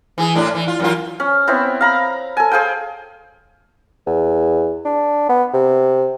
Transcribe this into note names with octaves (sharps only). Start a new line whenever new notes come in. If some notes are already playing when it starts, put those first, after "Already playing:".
E3 G#4
A2 D4
E3
F4
F#2 E3 F4
C#4
B3 C4 E4 C#5
F5 A#5 B5
A4 G#5
G#4 C5 F5 G5
E2
D4
B3
C3